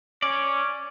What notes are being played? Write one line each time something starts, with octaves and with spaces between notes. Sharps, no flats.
C#4 D5